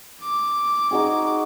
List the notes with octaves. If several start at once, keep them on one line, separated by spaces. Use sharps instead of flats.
D6
D#4 F#4 G#4